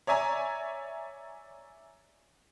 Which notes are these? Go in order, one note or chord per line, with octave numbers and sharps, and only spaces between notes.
C#5 D5 E5 G#5 A#5